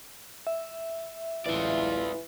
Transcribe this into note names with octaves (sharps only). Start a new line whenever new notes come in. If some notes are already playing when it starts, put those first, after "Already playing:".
E5
A1 E3 G#3 E4 F4 D5